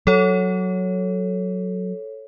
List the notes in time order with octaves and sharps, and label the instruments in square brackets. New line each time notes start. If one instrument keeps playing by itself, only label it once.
[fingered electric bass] F#3 [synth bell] A4 C#5